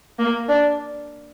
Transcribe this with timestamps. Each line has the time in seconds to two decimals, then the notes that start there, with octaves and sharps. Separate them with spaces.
0.19 A#3
0.48 D4